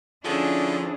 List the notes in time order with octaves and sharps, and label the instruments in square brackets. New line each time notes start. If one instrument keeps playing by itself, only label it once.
[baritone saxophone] D3 [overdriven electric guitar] F3 [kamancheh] C#4 G#4 [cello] D4 E4